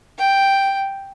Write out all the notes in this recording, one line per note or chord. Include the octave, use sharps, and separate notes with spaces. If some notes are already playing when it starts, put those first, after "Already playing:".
G5